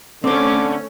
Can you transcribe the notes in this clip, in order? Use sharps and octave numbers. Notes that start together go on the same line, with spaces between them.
D3 A3 C4 C#4 C5 D6